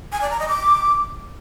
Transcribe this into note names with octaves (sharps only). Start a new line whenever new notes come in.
G#5
D5
A#5
D#5
D6